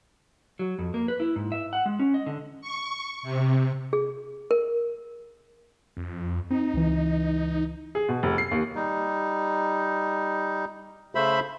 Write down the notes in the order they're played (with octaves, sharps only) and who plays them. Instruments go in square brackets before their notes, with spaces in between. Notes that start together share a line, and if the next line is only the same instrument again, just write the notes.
[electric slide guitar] F#3
F2
A#3
B4
E4
G#2
E5
F#5
G#3
C#4
D#5
D3
[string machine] C#6
C3
[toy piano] G#4
A#4
[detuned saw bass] F2
[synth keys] C4 [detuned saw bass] D#4
[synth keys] C#2 E3
[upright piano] G#4
B2
F1
C7
D#2
[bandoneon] G3 D#4
C#3 A3 C5 E5 B5